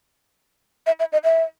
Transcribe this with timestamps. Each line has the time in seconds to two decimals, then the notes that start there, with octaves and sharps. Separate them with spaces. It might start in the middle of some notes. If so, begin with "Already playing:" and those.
0.87 E5
1.00 E5
1.12 D#5
1.24 E5